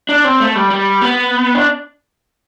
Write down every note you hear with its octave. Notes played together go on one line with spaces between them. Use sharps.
D4
C4
A3
G3
G3
B3
D4